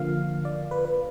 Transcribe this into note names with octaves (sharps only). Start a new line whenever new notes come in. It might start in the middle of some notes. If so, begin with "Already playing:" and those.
Already playing: D3 F3 A#3 F5
D5
B4
B4